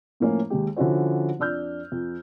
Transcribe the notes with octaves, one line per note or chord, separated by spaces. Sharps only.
A2 F3 A#3 C#4 F4
D#2 G#3 G4
D3 F3 C#4 E4 F#4 C5
F2 D4 E6 F6 G6
F2